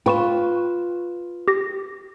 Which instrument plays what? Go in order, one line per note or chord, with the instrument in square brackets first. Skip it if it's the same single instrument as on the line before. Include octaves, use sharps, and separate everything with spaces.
[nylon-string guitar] F4 B4 [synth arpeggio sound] G5 C#6 E7
[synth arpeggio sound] G4 A#6